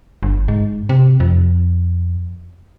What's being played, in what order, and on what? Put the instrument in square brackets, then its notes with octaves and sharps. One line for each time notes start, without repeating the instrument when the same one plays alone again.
[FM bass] G1
G#2
C3
F2